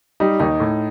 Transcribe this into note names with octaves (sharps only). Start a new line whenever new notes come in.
G3 D#4
D#2 D#4
A2